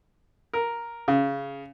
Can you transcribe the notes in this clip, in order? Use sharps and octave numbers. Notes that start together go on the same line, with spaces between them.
A#4
C#3